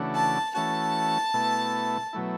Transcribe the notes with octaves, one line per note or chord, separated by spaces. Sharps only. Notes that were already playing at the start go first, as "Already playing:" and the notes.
Already playing: C#3 E3 A3 D4 F#4
A5
E3 A3 C#4 F#4 A5
B2 A3 E4
B2 F#3 A3 E4